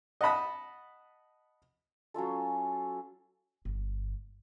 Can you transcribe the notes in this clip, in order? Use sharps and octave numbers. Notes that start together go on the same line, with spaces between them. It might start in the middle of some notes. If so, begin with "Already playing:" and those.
D#5 F#5 A5 B5 D#6
F#3 C#4 F4 A4
G1